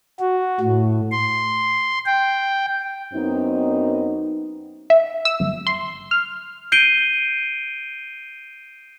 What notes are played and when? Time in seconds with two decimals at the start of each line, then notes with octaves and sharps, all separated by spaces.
0.20 F#4
0.60 A2
1.12 C6
2.06 G5
3.14 F#2 B3 C4 D#4
4.90 E5
5.25 E6
5.40 G1
5.67 C6
6.11 F6
6.72 G6 C7 D7 D#7 G7